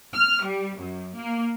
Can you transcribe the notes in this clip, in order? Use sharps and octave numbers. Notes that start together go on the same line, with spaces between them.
F6
G3
F#2
A#3